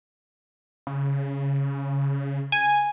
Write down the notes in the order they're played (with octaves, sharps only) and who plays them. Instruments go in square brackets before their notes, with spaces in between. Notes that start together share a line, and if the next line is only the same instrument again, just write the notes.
[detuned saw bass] C#3
[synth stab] G#5